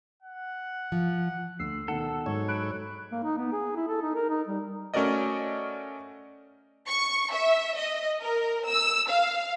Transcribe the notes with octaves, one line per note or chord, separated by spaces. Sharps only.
F#5
F3
D2 E6 C7
B2 D#3 A4 F#5
G#2 F#3 C#5
B5 F#6 D7
A#3
D#4
B3
G#4
E4
A4
D#4
A#4
D#4
G3
A3 C#4 F#4 A#4 D5 D#5
C#6
E5
D#5
A#4
E6
F5